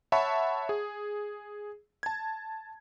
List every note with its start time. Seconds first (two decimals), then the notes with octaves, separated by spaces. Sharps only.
0.12 C#5 E5 F#5 A5 B5 C#6
0.69 G#4
2.03 A5 G#6